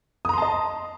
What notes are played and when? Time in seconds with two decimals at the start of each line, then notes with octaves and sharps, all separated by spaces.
0.25 D#6
0.29 A#5
0.33 C6
0.38 A5
0.42 D#5